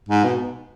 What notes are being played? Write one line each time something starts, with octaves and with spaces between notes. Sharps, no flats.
G#2
B2